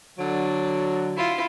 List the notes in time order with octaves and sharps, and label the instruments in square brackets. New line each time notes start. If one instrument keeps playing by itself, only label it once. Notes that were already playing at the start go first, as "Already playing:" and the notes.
[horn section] D3 F#3 [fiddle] D5
[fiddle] E4 F4